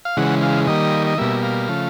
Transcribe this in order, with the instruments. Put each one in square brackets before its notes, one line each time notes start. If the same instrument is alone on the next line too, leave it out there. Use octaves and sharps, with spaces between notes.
[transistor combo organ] F5
C#3 E3 G#3 F#5
F5
D#3 G3 A#3 D#5
D#5
B2 G3 A#3 E5
F5
C#3 F3 A3